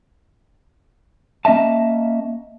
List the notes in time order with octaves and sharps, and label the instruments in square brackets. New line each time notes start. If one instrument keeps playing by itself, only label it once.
[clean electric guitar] A#3 C#4 D#5 E5 A5